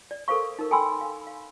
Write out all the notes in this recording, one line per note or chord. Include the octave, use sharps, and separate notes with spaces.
D5
A4 A#4 C5 F5 C#6
D#4 A#4
A4 G5 G#5 B5 C6 E6
F5
F5